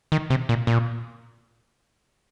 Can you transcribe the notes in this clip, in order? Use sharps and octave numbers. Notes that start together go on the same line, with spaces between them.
D#3
C3
A#2
A#2